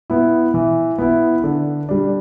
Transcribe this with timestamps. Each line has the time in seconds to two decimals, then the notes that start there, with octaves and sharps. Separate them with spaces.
0.10 B3 E4
0.54 E3
0.98 B3 E4
1.44 D3
1.89 G3 D4